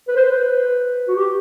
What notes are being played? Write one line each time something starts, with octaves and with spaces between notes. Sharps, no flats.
B4
C5
B4
F#4
G4